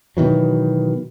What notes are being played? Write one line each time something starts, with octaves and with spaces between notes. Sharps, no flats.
B2 D#3 E3 F#3